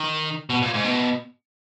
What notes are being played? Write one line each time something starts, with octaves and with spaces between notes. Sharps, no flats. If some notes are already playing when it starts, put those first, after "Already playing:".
Already playing: D#3
B2
A#2
G#2
B2